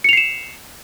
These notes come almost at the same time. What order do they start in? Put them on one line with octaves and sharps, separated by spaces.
C#7 F7 C7 E7